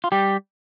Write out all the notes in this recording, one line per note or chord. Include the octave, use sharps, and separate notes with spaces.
F4
G3 G4